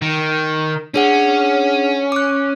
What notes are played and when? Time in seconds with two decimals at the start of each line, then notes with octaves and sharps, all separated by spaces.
0.02 D#3
0.94 C#4 D4 G#4 F#5
2.12 D6 F#6